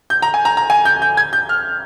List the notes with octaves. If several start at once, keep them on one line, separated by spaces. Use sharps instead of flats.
G6
A#5
G#5
A#5
A#5
G#5
G6
G6
G#6
G6
F6